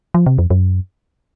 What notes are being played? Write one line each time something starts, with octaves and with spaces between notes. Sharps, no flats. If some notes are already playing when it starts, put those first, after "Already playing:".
F3
C3
F2
F#2